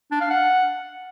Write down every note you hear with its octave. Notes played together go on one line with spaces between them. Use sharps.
D4
F5
F#5